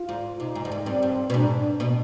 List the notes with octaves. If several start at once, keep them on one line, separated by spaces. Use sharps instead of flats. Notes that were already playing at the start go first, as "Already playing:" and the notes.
Already playing: F4
G#2
C3 D#4
G#2
G2
G#2
G2 C4
G2
B2
G#2 D4
B2